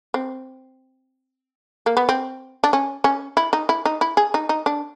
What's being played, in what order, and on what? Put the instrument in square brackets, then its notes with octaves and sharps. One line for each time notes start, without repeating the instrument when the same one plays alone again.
[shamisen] C4
A#3
B3
C4
D4
C#4
C#4
E4
D#4
E4
D#4
E4
G#4
D#4
D#4
D4